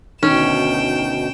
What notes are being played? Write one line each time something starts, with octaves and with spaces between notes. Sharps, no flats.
D2 B2 D#3 C#4 G5 E7